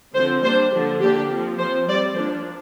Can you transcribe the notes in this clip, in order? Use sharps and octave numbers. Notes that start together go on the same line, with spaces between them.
D3 F3 C4 C5
G3 A#3 D4 C5
D3 F3 D4 G4
D3 A#3 D4 G4
F3 C4
F3 C4 C5
G3 C4 D5
F3 A#3 D4 C5